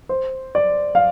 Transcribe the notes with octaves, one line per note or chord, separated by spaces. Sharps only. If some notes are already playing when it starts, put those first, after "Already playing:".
C5
D5
F5